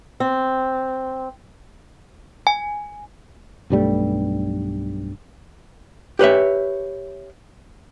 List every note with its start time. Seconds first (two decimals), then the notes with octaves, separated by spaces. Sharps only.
0.20 C4
2.47 G#5
3.70 B1 G2 G3 A3
6.19 G4 B4 C#5 E5